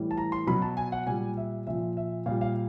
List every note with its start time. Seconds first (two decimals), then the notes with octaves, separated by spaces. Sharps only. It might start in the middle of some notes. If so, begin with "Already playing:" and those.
Already playing: A2 E3 G3
0.11 A5
0.17 A#5
0.32 C6
0.47 B2 F#3 B5
0.62 A5
0.77 G#5
0.92 F#5
1.07 A#2 G3 G#5
1.37 E5
1.67 A#2 F3 E5
1.97 E5
2.26 A#2 G3 F5
2.41 F5